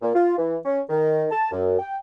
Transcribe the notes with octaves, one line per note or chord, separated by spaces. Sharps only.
A#2
F4
E3
C#4
D#3
A5
F#2
G5